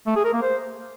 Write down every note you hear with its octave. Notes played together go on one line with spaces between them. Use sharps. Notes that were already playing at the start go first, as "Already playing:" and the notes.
A3
G#4
A#4
A#3
C5